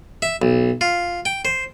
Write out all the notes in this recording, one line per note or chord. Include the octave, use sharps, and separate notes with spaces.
E5
B1
F4
G5
C5